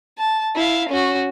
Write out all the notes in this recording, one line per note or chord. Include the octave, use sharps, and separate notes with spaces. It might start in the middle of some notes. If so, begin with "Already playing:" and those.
A5
E4 F5
C#4 F#4